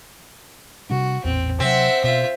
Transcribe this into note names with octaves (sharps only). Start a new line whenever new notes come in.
C3 G3 D4 F#4
A1 E2 A#2 C4
C3 F#3 C4 E5 F#5
B2 F4 E5